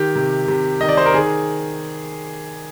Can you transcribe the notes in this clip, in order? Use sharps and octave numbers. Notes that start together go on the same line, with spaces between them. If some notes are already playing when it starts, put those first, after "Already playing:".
Already playing: D#3 G4
C3
C3
D#3 D#5
D5
C5
A#4
D#3 G#4